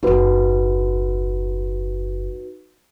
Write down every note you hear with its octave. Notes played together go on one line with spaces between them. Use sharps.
F#1 D#2 D#4 F#4 B4